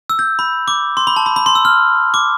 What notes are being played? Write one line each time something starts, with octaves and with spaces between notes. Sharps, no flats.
E6
G6
B5
D6
C6
B5
A5
B5
B5
C6
E6
F6
D6